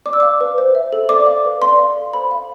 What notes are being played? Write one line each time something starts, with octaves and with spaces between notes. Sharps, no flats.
D5 D6
E6
F5 D6
B4
C5
E5
A4
D5 D6
F5
B4
D5 C6
F5
A4
C5 B5
F5